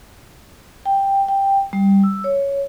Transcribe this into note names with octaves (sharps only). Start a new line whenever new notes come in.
G5
G5
G3
E6
C#5